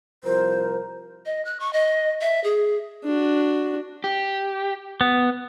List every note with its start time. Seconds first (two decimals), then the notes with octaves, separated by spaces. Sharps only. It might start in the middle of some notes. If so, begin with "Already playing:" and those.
0.24 C2 F3 A#4 C5
1.26 D#5
1.45 F#6
1.60 C#6
1.73 D#5
2.21 E5
2.44 G#4
3.04 D4 F#4
4.04 G4
5.01 B3